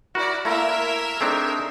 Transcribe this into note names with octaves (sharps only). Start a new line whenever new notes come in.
E4 F#4 A#4 D5
A3 A#3 E4 A#4 E5 A#5
A3 C4 D4 D#4 G#4